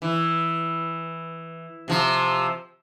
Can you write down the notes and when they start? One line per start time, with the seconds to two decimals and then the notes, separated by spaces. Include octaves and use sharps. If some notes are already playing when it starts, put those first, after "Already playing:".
0.02 E3
1.88 C3 F3